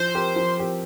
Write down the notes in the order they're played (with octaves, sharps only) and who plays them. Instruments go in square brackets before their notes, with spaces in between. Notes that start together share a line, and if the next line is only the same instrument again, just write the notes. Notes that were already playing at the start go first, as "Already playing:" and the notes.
Already playing: [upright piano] F3 [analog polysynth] C5
[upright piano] C4 G4 A#4
F3
C4 G4 A#4